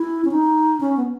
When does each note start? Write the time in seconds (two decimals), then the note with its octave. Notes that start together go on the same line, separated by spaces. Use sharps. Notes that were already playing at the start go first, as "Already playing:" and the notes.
Already playing: E4
0.25 C#4
0.31 D#4
0.80 C#4
0.97 B3